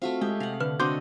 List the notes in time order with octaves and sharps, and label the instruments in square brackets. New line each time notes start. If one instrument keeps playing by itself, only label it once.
[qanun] A3 E5 F5 [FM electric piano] C4 F4 F#4
[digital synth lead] G#3 [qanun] G4
[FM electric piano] C3 [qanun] F5 F#5
[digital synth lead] D3 [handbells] B4 F6
[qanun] D3 C4 D#5 [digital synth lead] F#4 [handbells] C6 D6 G6